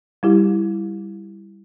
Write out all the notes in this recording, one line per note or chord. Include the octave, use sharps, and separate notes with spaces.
G3 E4 G4